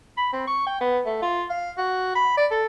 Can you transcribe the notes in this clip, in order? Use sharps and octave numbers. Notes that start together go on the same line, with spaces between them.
B5
C4
C#6
G5
B3
A3
F4
F5
F#4
B5
D5
A4